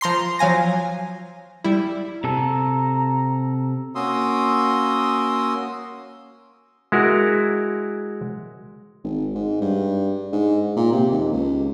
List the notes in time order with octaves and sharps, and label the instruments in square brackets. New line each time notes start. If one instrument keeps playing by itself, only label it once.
[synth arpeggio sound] F3 A#5 C6 C7
F3 F#3 F5 G#5 A#6
G3 E4
[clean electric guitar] C3 A4 [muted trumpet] A#5
[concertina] A#3 C#4 F#4 C6 D#6 E6
[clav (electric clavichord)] G#3 E4 F#4 A#4
[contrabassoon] G#1
G#2
G2
G#2
A#2
C3
D#2
C#2